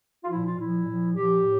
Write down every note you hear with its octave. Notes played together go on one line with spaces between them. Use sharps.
F4
A#2 F3 E4
F4
A#2 F3 E4
A#2 F3
A#2 F3 G4
A2